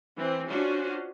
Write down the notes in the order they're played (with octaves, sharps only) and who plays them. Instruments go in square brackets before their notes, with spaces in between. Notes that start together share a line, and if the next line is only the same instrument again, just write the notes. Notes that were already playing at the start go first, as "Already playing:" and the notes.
[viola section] E3 C4
C#4 D4 F4 F#4 C5